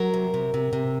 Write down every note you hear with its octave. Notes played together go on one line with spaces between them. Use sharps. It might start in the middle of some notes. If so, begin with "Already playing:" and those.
Already playing: F#3 A#4
C3
C3
C3
C3